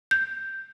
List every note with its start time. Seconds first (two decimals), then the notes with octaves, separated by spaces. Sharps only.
0.11 G6